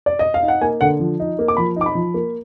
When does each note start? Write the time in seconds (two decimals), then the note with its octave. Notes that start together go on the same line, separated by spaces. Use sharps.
0.06 D5
0.19 D#5
0.34 F5
0.42 D#4
0.48 F#5
0.61 A#3 G#5
0.81 D3 F#5
1.00 F3
1.20 D#4
1.39 A#3
1.48 D6
1.57 F3 B5
1.76 D#4 D6
1.86 B5
1.95 F3
2.14 A#3